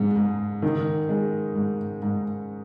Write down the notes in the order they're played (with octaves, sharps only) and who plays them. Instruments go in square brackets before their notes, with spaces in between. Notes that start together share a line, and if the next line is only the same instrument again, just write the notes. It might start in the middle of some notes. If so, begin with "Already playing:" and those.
Already playing: [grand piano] G#2 G#3
G#2
D#3
G#3
G#2
G#2